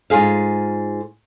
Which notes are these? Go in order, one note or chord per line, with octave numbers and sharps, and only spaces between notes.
G#2 F4 G#4 F5